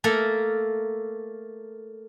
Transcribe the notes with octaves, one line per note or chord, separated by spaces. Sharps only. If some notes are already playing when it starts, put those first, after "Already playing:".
A3 A#3 A4 A#4